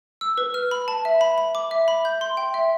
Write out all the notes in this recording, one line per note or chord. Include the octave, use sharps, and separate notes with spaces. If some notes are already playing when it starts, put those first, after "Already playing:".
E6
B4
F6
B5
A5
E5
B5
B5
D6
E5
B5
G6
C6
G5
E5